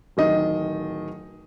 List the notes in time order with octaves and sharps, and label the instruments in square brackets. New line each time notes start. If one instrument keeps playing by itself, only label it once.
[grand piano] D1 D#3 D#5